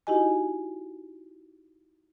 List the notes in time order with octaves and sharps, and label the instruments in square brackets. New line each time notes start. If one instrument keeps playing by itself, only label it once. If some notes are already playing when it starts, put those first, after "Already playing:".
[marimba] D#4 E4 F#4 G4 D#5 G#5